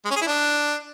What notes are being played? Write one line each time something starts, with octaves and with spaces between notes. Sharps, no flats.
G#3
C#4
G#4
E4
D4